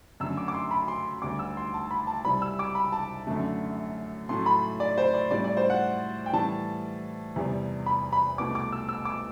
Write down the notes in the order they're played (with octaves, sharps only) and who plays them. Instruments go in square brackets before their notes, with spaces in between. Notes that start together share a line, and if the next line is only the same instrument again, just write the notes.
[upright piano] F#2 D3 F#3 A3 E6
D6
D6
C6
B5
C6
D2 D3 G3 D6
E6
C6
A5
B5
A5
C2 C3 G3 B5
E6
D6
B5
A5
F#2 D3 A3
A2 F#3 A3 C6
B5
D5
C5
D5
A2 G3 D5
D5
C5
F#5
G5
A2 E3 G3 A5
E2 C3 G3
B5
B5
C2 B2 A3 D6
D6
E6
E6
D6